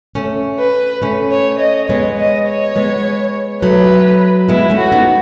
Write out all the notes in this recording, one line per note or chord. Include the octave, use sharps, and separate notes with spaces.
A3 C#4
B4
A3 C#4
C#5
D#5
G#3 B3 C#5
D#5
C#5
G#3 B3
F#3 A3 B4
G#3 B3 E4
A3 C#4
F#4
B3 D#4